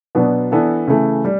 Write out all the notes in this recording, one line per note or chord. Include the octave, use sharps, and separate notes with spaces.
B2 F#3 B3 D4
E3 B3 D4 A4
C#3 E3 A3
G3